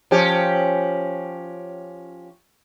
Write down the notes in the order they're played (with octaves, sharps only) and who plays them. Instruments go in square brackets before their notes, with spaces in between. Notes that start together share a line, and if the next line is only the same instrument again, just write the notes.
[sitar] F3 C#4 G4